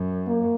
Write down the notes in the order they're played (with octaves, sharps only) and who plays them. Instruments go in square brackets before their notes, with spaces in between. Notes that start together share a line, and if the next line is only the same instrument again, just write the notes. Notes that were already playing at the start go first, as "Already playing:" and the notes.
Already playing: [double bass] F#2
[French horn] A#3